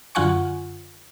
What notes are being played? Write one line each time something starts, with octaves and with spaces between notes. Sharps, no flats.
F#2 D3 F4 F#5 G#5 C#6